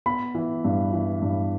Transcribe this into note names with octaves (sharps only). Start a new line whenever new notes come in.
B3 B5
E3
G2
E3
G2